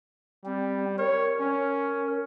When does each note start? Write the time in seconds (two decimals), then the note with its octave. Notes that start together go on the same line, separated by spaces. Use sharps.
0.45 G3 C4
0.98 A#4 C#5
1.40 C#4